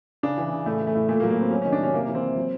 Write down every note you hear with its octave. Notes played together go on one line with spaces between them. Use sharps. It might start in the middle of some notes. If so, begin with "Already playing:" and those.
C#3 D4
E3
C#3
A2 A3
E3
A3
A2
A#2 A3
A#3
F#3
A#3
A#2 C4
F#3 C#4
C#4
D#3
D4
C3 C#4
C3 A#3
E3
C4
C3
F#3